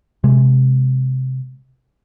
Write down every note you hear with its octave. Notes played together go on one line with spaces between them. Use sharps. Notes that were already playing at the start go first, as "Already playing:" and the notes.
C3 G#3